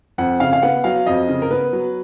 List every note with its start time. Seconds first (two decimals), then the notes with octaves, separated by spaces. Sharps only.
0.18 F2 F#5
0.40 C#3 F5
0.53 F5
0.63 B3 F#5
0.84 F#3 F5
1.06 F2 D#5
1.29 C#3
1.42 A#4
1.51 B3 B4
1.73 F#3